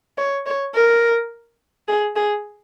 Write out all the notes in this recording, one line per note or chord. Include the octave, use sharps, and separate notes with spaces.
C#5
C#5
A#4
G#4
G#4